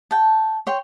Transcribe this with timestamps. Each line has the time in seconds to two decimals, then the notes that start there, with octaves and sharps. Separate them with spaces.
0.11 G5 A5
0.67 C#5 G5 C6